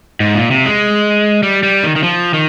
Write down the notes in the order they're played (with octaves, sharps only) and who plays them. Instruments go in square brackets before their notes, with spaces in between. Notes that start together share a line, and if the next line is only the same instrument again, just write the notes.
[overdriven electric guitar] G#2
A#2
C3
G#3
G3
G3
D#3
D#3
F3
D#3